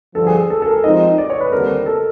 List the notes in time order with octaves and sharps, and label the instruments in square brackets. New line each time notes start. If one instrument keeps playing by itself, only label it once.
[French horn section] G2 D3 F3 [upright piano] A4
[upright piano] G#4
A4
A4
A#4
[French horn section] F3 G#3 C4 D#4 [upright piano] D#5
[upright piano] D5
C#5
B4
[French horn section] D#2 D3 G3 C4 [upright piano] A#4
[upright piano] A4